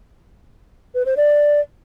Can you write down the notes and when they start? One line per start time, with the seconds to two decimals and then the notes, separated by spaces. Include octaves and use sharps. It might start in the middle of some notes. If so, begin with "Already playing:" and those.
0.95 B4
1.06 C5
1.17 D5